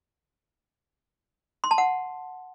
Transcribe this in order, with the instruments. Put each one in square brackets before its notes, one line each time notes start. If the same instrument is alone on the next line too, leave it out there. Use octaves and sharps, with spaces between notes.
[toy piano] C6
A5
F#5